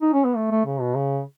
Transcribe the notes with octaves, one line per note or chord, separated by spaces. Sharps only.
D#4
C#4
B3
A3
A3
C#3
B2
C#3